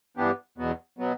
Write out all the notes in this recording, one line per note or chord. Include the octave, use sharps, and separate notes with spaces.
G2 E3 B3 D4 G4
E2 B2 F#3 B3
B2 F#3 B3